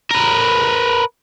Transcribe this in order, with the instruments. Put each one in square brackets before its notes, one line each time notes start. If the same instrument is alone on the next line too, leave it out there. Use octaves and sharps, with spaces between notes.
[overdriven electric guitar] A#4 B4